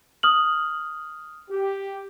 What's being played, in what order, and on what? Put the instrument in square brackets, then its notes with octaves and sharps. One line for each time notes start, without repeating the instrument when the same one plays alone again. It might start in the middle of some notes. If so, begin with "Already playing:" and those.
[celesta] D#6 F6 F#7
[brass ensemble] G4